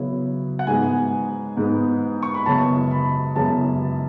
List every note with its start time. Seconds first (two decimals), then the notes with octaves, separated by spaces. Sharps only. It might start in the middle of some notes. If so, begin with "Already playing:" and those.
Already playing: C#3 F#3 B3 E4
0.59 F#5
0.67 G#2 G#3 B3 G#5
1.57 G#2 G#3 B3
2.23 C#6
2.34 B5
2.46 F#2 C#3 G#3 B3 E4 A5
2.91 B5
3.36 F#2 C#3 G#3 B3 E4 A5